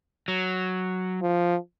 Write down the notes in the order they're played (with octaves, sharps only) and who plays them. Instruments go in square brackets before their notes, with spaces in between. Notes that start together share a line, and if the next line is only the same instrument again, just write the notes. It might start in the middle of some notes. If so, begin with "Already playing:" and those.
[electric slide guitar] F#3
[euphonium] F3